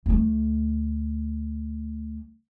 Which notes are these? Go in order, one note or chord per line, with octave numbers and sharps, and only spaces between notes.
D2 A3